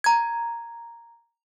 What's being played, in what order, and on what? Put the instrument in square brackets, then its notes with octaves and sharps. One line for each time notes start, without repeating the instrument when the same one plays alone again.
[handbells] A#5 G#6